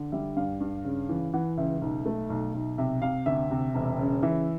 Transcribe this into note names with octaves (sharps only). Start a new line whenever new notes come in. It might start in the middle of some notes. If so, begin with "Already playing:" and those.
Already playing: D3
G3 E5
G2 F5
G2
C#3
E3
E3 F#5
C#2 E5
B1
A3
B1
B1
C3 E5
C3 F5
D2 E5
C3
E1
C#3
E3 E5